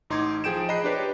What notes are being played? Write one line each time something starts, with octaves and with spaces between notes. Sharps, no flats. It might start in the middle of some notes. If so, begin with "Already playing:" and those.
A1 D#4 C6 D6 G#6
F3 G#4 G5 G6 D7 E7
D#5 A#5 B5 F#6 C7
D4 G4 B4 C#5